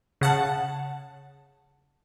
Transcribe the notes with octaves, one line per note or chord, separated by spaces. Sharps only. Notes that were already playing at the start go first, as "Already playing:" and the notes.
C#3 F#5 A5